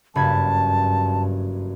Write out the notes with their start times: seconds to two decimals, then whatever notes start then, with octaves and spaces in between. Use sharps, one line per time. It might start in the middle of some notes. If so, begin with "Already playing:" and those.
0.15 F#1 G2 A5 B5 G#6